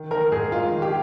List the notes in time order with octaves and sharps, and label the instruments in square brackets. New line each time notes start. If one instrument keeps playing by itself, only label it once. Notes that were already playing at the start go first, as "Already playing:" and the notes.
Already playing: [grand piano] D#3
D#3 A#4
G#2 G#4
G#2 F4
D#3
G4